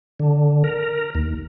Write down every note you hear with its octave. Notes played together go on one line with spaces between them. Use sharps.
D3
A#4
D#2